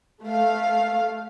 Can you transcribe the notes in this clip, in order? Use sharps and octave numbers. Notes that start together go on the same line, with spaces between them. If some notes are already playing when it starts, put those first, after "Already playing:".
A3 F5